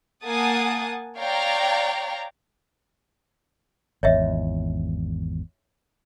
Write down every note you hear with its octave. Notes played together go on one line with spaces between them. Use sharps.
A#3 F#5 G#5 A5 D#6
C#5 D5 F5 G5 A#5
G#1 E2 C#5 D#5 E5